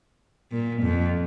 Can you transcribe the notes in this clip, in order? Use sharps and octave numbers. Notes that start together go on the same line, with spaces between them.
A#2
F2